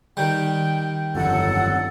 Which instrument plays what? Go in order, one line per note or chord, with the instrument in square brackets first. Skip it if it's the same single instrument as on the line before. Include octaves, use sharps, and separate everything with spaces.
[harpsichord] D#3 G3 [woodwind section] G5
[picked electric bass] G1 F2 [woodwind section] F#3 A4 [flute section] F#5